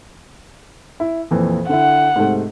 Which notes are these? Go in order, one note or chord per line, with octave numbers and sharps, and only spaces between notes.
E4
F2 A#2 E3
D3 E4 F#5
G#2 C3 A3